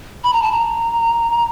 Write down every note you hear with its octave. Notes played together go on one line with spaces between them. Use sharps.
B5
A#5
A5
A#5